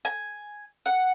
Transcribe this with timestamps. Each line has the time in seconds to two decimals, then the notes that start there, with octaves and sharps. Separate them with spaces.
0.05 G#5
0.86 F#5